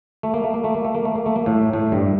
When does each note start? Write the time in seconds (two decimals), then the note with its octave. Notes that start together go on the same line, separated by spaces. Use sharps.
0.23 A3
0.34 A#3
0.44 A3
0.54 A#3
0.64 A3
0.74 A#3
0.85 A3
0.95 A#3
1.05 A3
1.16 A#3
1.26 A3
1.36 A#3
1.46 A2 A3
1.73 A2 A3
1.92 G2 G3